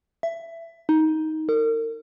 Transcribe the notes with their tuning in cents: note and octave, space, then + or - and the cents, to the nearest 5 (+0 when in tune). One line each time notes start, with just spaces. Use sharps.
E5 +15
D#4 +15
A#4 -40